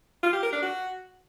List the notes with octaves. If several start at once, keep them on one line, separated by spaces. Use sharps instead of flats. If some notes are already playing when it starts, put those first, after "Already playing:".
F4
G4
A#4
D4
F#4